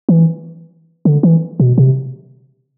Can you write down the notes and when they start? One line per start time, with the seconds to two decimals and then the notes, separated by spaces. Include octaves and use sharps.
0.09 E3
1.05 D3
1.23 E3
1.60 B2
1.78 C3